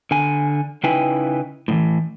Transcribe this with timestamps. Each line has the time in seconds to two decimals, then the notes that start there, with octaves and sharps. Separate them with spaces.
0.11 D3 G#5
0.84 C#3 D#4 E4 B4 G5 G#5
1.68 A2 D#3 E3